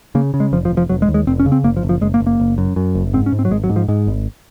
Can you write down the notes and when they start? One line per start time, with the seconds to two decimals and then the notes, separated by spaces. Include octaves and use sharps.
0.15 C#3 A#3
0.34 C#3
0.40 G#3
0.52 F1 F3
0.65 F3
0.71 F1
0.77 F3
0.89 F1 F#3
1.02 G#3
1.08 D#2
1.14 G#3
1.27 F1 C4
1.40 C#4
1.46 C#3
1.52 C4
1.64 F#1 A#3
1.76 F3
1.83 F#1
1.89 F3
2.01 F#1 G#3
2.14 A#3
2.20 F#1
2.27 A#3
2.40 F#1
2.58 F#2
2.76 F#2
2.95 F#1
3.13 G#2 C4
3.26 C#4
3.32 G#2
3.39 C4
3.45 F#3
3.51 G#1 G#3
3.64 F#3
3.70 G#2
3.76 F3
3.88 G#2 G#3
4.07 G#1